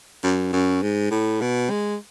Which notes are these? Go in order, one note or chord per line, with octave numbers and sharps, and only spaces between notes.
F#2
F#2
G#2
A2
B2
G#3